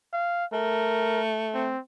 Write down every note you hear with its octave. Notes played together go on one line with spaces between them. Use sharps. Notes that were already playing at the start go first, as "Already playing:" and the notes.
F5
A3 A#4
C4